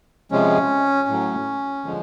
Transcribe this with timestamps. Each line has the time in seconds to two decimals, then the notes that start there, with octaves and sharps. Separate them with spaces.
0.31 C3 F3 G#3 C#4
1.08 A2 F#3
1.85 D3 F3 G#3